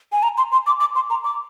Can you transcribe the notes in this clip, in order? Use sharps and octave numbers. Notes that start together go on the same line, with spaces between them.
G#5
A#5
C6
C6
D6
D6
C6
A#5
D6